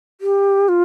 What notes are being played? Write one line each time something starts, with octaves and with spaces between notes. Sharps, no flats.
G4
F4